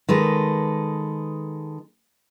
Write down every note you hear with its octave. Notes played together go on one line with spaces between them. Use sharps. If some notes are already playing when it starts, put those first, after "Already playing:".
D#3 G#3 A4 B4